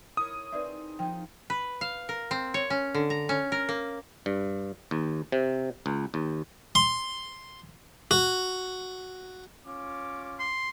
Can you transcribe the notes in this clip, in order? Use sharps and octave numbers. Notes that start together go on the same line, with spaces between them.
E4 A#4 C#5 D#6
C4 D#4 G#4 B4 D5 E5
F3 D#4 G5
B4
F5
A#4
C4
C#5
C#4
D3
A#5
C#4
A#4
A#3
G2
D#2
C3
C#2
D#2
C6
F#4
C#4 F4 D6
C6